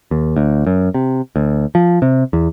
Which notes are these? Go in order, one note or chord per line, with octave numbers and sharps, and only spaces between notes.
D#2
D2
F#2
C3
D2
F3
C3
E2